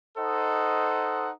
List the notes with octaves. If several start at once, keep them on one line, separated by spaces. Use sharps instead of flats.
D#4 A4 C5 D#5 F#5